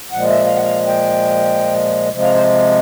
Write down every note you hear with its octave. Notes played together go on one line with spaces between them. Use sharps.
A#2 F3 G#3 F#5
E5
F5
F#5
F5
G5
C3 F3 G#3
F5
C5